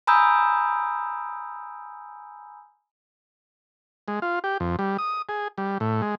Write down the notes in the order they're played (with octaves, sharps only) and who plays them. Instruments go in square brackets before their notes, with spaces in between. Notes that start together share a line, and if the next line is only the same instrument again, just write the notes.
[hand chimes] G#5 A#5 B5 D#6 E6 G6
[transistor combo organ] G#3
F4
G4
F2
G3
D#6
G#4
G3
A2
G#3